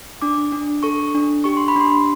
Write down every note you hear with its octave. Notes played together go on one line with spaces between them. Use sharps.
D4 D6
D4
A4 C#6
D4
G4 C#6
C6
B5
D4 C6